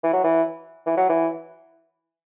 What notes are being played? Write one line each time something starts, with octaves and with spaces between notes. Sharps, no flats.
E3
F#3
E3
E3
F#3
E3